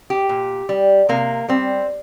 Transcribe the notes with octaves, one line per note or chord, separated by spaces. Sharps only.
G4
A#2
G3
C3 A#3
G3 C4